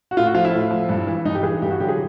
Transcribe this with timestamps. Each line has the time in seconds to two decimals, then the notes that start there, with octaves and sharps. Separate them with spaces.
0.11 F#4
0.17 A2 F4
0.26 F#4
0.35 F3 F4
0.45 E4
0.53 A2
0.71 F3
0.89 G2
1.07 E3
1.25 G2 D#4
1.35 G4
1.43 E3 G#4
1.61 G2 G4
1.71 F#4
1.79 D3 F#3 G4
1.88 G#4